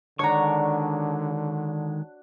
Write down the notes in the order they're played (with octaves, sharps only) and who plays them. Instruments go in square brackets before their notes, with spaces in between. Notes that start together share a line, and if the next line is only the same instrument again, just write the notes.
[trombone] D3 [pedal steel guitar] D#3 G#3 C#6 [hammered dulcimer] D4 F#4 [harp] C#5 A#5